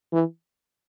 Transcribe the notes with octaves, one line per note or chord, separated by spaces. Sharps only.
E3